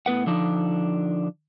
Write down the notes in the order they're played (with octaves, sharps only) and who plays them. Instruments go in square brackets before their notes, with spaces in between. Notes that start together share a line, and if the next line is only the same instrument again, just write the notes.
[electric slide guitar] A2 B3 B4 F#5
D3 F3 D4 D#4